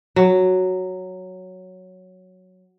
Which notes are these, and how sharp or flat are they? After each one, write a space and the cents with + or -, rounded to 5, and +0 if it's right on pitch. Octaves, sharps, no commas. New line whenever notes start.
F#3 +0